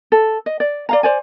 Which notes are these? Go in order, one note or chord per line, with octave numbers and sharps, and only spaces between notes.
A4
D#5
D5
D5 F5 A#5
C5 D5 G#5